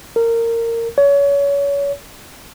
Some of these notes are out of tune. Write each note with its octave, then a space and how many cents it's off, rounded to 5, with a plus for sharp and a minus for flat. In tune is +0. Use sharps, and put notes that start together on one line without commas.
A#4 -20
C#5 +30